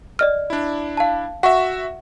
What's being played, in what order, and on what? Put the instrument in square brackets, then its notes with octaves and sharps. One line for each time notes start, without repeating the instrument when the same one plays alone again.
[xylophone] D5 D#5 F6
[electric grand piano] D4 E4
[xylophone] F5 A5
[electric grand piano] F#4 E5 [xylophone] F#5 C#6